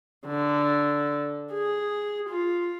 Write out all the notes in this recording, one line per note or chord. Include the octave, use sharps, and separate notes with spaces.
D3
G#4
F4